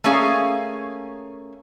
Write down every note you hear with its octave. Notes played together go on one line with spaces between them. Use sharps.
A3 A#3 C#4 G#4 F5